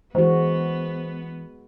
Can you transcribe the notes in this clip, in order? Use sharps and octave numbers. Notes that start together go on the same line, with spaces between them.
E3 G#3 B3 F#4 C5